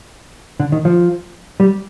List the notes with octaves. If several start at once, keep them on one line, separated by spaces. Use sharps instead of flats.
D3
D#3
F3
G3